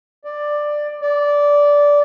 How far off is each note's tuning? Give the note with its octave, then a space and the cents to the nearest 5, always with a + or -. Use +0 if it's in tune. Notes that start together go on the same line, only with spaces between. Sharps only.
D5 +10
D5 -15